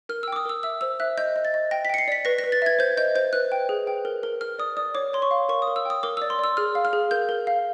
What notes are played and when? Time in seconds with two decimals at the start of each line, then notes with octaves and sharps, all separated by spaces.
0.09 A#4 F6
0.23 E6
0.28 G5 D6
0.36 D#6
0.45 A#4 E6
0.63 E5 E6
0.81 C5 E6
1.00 E5 F#6
1.18 D#5 G6
1.36 D#5
1.45 A6
1.54 D#5
1.71 G5 A#6
1.85 B6
1.90 G5 C#7
1.98 C7
2.08 D5 B6
2.25 B4 A#6
2.39 A#6
2.44 B4
2.52 A6
2.62 E5 G#6
2.79 C5 G6
2.97 D#5 G6
3.15 C5 G6
3.33 B4 F#6
3.52 G5
3.69 G#4
3.87 G5
4.05 A#4
4.23 A#4
4.41 A#4 F6
4.59 D5 D#6
4.77 D5 D#6
4.95 C#5 D6
5.13 C#5 C6
5.22 C#6
5.31 F5
5.49 A#4 C#6
5.62 D#6
5.67 A#4
5.76 E6
5.85 G5 D#6
6.03 A#4 D6
6.17 E6
6.22 D5
6.30 C6
6.39 D5 E6
6.57 G#4 F6
6.75 F5
6.85 F6
6.93 G#4
7.11 A#4 G6
7.29 A#4
7.47 F5